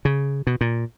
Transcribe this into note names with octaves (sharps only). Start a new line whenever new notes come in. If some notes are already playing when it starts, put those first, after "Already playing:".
C#3
B2
A#2